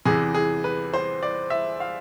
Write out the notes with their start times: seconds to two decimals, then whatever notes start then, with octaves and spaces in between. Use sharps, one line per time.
0.05 E2 C3 E3 G#4
0.34 G#4
0.64 B4
0.94 C5
1.23 D5
1.50 E5
1.80 F5